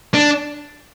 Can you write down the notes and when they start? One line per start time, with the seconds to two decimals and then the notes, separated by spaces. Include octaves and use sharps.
0.14 D4